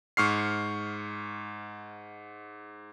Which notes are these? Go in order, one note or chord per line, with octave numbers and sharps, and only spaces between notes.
G#2 C#6 F6 C7